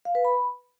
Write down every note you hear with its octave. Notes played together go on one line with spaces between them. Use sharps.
F5
B4
B5